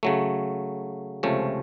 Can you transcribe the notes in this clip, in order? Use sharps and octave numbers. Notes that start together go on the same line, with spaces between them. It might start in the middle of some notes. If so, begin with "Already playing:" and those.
C#3 F#3 A3
C#2 C3 F3 A3 C#4